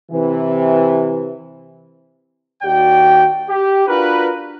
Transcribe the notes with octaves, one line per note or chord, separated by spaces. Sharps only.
C3 E3
D#2 F#4 D5 G5
G4
D4 F4 F#4 A#4 B4